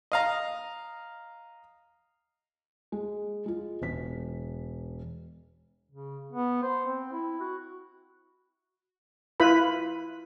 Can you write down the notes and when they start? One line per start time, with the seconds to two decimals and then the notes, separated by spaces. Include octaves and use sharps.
0.12 D#5 F5 A#5
2.92 G#3
3.46 G#3 F4
3.82 E1 B6
5.92 C#3
6.32 B3
6.63 C5
6.86 C4
7.12 E4
7.40 F#4
9.40 E4 F4 B4 B5